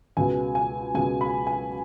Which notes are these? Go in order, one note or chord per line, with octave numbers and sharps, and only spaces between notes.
C#2 B2 G#3 B3 G#5
G#5
C#2 B2 G#3 B3 G#5
B5
G#5